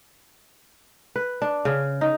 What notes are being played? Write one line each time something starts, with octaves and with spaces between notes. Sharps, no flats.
B4
D4
C#3
D#4